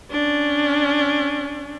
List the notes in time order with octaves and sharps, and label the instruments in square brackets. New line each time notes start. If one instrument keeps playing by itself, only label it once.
[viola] C#4 D4